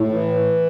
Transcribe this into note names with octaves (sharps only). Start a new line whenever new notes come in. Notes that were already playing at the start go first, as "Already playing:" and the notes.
Already playing: A2
E3